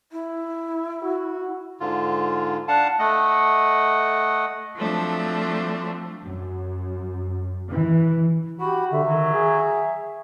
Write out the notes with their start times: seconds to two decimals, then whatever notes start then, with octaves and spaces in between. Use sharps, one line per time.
0.12 E4
1.03 F#4
1.80 G#2 D3 F4
2.68 D4 F5 F#5 A5
2.99 A3 D#5 F#5
4.76 F3 F#3 A3 C4 D4
6.24 F#2
7.71 E3
8.60 F#4 G4 B5
8.92 D3 E5
9.04 D#3 F#3
9.33 G#4